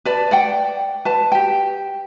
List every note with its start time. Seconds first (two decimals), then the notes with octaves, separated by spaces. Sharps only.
0.05 B4 D5 A5
0.31 D5 F#5 G5
1.05 B4 A5
1.32 G4 G5